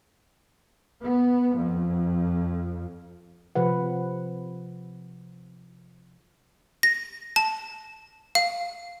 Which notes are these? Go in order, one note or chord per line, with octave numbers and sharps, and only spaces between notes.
B3
F2
C3 F3 B4 F#5
A#6
A5
F5